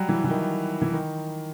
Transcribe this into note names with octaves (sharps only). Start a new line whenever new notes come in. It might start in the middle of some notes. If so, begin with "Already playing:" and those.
Already playing: F#3 G3
E3
E3
D#3
E3
D#3